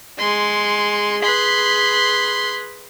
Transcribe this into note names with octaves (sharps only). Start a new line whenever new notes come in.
G#3 C6
G#4 B4 B5 C6